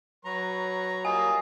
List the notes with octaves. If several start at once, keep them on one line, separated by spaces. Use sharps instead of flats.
F#3 B4 A#5 C#6
G3 A#3 F4 D#5 G#5